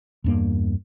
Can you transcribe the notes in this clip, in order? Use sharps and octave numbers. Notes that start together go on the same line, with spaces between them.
E2 G2 A#3